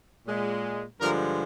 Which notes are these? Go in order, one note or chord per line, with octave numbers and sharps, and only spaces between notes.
A#2 G#3
G2 D3 F3 G#3 A#4